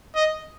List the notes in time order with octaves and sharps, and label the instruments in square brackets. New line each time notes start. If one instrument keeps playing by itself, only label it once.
[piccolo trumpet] D#5